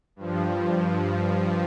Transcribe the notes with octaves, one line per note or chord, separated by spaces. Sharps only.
G2 F3